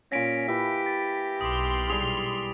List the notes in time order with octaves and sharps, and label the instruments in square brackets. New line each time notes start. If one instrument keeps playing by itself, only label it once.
[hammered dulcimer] A#2 G#5 [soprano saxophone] C#4 [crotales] A#6 B6 D7
[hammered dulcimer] E4 B4 [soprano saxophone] G4 [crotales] B6
[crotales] A6
[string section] B1 C6 F6 [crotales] D6 D#6
[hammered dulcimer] G3 G#4 [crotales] F7